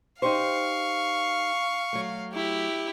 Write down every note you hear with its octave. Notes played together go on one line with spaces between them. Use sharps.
D#4 G4 C5 F5 C#6
F#3 A3
E4 G4